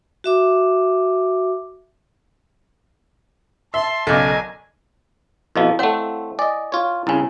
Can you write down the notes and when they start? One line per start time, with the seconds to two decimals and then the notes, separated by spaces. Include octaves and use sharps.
0.24 F#4 E5 D6
3.74 E5 A5 C6
4.07 B1 C#3 D4 A4 A#4 D#5 G#5 D6
5.56 F2 B2 F3 E4 D#5 F5
5.79 A3 C4 C#5 F#5
6.39 D5 D#5 G#5
6.72 F4 C#5
7.07 C2 C#3 E4 G#5